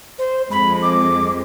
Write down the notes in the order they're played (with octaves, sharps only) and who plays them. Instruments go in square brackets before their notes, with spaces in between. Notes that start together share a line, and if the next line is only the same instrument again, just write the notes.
[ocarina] C5
[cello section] F2 G#3 [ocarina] B5
[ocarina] D6